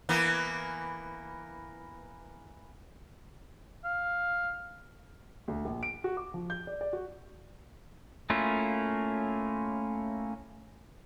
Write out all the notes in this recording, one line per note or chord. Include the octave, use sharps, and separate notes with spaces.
E3 A#3 B3
F5
D2
A#1
D7
F#4
D6
F3
G6
D5
D5
F#4
A3 A#3 C#4 E4 F4